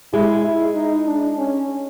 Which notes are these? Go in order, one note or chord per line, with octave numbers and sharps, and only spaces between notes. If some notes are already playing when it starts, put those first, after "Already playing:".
G#3 E4
E4
D#4
D4
C#4